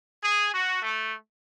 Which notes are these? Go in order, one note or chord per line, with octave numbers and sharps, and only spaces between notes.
G#4
F#4
A3